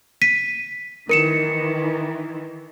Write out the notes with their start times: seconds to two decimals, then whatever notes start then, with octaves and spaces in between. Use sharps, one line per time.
0.22 B6 D#7
1.09 D#3 E3 A#4 C#7 E7